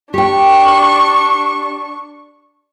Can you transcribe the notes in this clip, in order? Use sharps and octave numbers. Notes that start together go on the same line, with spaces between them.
D4 G4 G5 C#6